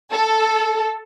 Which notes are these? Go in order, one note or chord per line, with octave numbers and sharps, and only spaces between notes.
A4